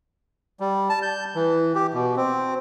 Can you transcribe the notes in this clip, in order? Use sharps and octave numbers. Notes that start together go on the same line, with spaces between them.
G3
A5
G6
E3
G4
B2
C4